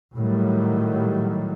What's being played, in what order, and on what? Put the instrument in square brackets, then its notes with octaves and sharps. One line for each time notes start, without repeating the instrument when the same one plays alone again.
[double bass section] A2 D#3 F#3 G3